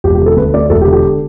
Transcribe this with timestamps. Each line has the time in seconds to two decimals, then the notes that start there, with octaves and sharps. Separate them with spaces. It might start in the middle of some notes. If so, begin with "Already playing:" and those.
0.04 E1 G4
0.15 G4
0.21 D3
0.26 A4
0.37 D2 B4
0.54 A3 D5
0.70 E1 A4
0.81 G4
0.87 D3
0.93 G4